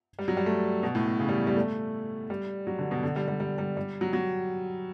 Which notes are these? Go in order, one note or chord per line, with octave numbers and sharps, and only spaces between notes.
G3
F#3
G3
A3
B2
A2
B2
C#3
G3
G3
A3
G3
F#3
D3
B2
D3
G3
G3
G3
G3
G3
F#3
F#3